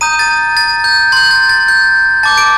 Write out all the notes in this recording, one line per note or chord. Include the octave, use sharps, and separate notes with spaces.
A#5 D#6 G6 D#7
A6
A6
G6
C6 G6 A6
A6
A6
G6
A5 D6 G6 A6
D7